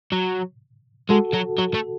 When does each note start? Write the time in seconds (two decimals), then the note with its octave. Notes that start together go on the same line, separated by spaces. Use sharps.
0.12 F#3
1.10 G#3 F#4 A4
1.34 F#3
1.59 F#3
1.74 A3